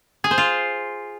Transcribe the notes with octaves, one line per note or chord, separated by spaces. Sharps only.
G#4
C5
F4